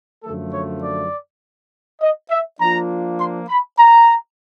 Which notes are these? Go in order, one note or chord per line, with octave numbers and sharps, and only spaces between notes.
F#2 D3 F3 A3 A4
C#5
D5
D#5
E5
F3 A#3 D4 F4 A#5
C6
B5
A#5